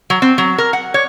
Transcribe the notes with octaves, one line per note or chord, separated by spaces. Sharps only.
F#3
C4
F#3
A#4
F#5
C#5